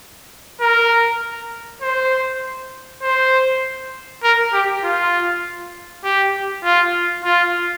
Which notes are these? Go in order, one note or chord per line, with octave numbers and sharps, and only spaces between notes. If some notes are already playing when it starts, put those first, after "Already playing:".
A#4
C5
C5
A#4
G4
F4
G4
F4
F4